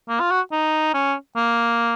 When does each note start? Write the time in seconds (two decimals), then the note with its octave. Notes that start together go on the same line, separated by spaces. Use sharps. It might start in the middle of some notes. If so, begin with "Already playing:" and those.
0.09 A#3
0.20 F4
0.31 F#4
0.52 D#4
0.94 C#4
1.37 A#3